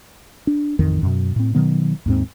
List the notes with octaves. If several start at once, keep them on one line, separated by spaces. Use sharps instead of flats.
D4
A1 F2 D#3
F#2 B2
A2 C4
B2 D#3 F#3 B3
D#2 G#2 C4